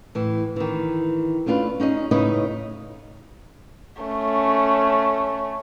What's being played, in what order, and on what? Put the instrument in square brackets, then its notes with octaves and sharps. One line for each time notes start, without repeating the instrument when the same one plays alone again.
[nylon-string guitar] A2 E3
D#3 E3
A3 C#4 D4 F4 B4
C#4 D#4 G#4 D#5
A2 C#3 D#4 E4 B4 D#5
[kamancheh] A3 C#4